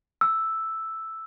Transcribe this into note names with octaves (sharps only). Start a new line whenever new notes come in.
E6